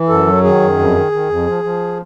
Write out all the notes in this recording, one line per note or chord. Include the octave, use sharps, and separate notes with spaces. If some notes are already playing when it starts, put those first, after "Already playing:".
Already playing: E3
F#2 A4
F#3
D#3 G#4
F#2
F2
D#3
D#3
F2
F3
F3